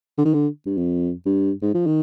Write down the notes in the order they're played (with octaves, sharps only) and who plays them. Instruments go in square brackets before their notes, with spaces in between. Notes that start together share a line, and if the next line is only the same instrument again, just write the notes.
[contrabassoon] D3
D#3
D3
G2
F2
G2
G#2
F3
D#3